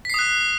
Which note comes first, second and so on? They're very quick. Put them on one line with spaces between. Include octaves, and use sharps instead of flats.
B6 C7 D#6 F#6